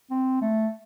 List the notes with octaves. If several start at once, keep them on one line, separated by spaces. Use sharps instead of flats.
C4
A3